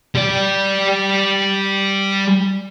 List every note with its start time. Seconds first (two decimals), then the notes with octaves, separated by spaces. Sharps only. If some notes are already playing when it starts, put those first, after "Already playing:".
0.15 G3 D5